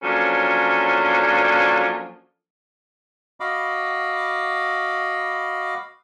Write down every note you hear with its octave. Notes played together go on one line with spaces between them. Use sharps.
F3 F#3 A#3 C#4 D4 A4
F#4 D#5 F5 B5 D6